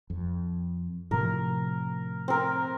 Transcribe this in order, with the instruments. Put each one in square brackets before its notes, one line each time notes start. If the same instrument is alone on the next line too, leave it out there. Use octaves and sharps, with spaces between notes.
[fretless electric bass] F2
[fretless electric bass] A2 C3 F3 [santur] A#4
[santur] C4 A#4